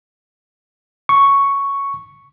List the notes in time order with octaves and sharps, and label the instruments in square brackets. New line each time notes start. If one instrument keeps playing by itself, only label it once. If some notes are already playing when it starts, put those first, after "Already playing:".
[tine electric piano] C#6